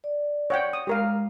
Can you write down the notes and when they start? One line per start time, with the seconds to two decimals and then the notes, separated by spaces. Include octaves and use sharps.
0.04 D5
0.50 C#5 F#5 G5
0.73 D#6
0.87 G#3 G4 A#4 F5